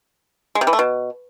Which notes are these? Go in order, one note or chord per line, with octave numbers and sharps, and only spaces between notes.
G#3
C3
E3
A3
B2